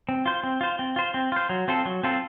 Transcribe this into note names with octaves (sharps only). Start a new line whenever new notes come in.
C4
F4 C5
C4
F4 C5
C4
F4 C5
C4
F4 C5
F#3
C4 F4 A4
F#3
C4 F4 A4